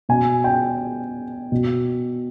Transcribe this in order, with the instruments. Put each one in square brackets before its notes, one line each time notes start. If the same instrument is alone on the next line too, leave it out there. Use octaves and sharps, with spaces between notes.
[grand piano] B2 G#5
G5
B2